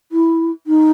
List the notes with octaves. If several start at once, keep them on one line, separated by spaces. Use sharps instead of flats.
E4
D#4